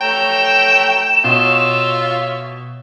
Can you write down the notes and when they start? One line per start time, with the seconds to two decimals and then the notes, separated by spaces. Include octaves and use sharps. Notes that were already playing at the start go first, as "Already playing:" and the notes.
0.01 A3 C#5 G5 A#5 E7
1.24 B2 F4 C#5 E5